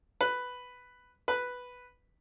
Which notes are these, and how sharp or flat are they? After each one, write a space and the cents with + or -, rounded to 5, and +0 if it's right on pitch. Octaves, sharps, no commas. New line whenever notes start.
B4 +5
B4 +0